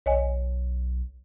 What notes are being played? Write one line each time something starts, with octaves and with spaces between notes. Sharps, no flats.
B1 C#5 D#5 G#5